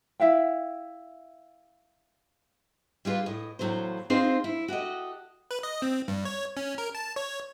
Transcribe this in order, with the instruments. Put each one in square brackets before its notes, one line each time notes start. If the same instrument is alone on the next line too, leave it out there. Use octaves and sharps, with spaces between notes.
[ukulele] E4 E5 F5 G5
[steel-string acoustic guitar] G3 G#3 F4 B4
A2 D#5
E2 A2 F#3 F4 C5
C4 D#4 F4 G#4 C5
E4
F#4 G4 A4 D#5
[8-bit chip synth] B4
D#5
C4
G2
C#5
C#4
A#4
A5
C#5